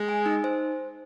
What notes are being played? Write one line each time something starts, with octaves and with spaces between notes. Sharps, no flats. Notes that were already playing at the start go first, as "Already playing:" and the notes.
Already playing: G#3
G#5
D#4
C5